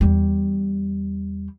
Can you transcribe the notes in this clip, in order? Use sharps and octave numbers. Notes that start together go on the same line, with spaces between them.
E2 G3